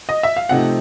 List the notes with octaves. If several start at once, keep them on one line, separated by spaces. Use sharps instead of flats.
D#5
E5
F5
C3 F3 A3 C4 D#4 F#5